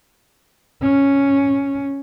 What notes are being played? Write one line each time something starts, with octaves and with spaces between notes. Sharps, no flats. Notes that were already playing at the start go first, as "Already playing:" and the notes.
C#4